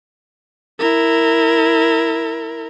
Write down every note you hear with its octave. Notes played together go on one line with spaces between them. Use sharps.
E4 A#4